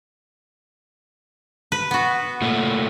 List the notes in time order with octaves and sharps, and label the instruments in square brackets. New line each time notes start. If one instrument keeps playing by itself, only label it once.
[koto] B4
B3 F#4
[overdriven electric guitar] A#2 A3